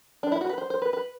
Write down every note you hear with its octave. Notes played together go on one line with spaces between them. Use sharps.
D4
E4
F#4
B4
C5
C5
B4
B4